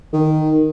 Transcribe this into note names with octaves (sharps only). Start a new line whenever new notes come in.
D#3